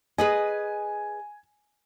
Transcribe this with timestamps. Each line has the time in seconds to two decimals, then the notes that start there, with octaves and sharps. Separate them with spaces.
0.18 G#4 B4 D#5 G#5